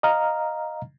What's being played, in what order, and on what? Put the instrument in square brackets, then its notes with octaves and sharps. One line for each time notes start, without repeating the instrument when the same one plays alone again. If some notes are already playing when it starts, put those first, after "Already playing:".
[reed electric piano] D#5 F5 A#5 F6